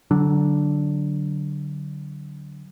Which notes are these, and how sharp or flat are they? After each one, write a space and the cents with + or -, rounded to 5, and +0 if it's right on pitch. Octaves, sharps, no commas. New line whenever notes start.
D3 +0 F#3 +25 D4 +0